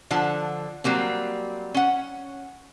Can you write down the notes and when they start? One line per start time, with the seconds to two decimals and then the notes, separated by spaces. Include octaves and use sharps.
0.11 D3 F3 A4 F#5
0.84 F#3 G3 A#3 C4
1.74 C#4 F#5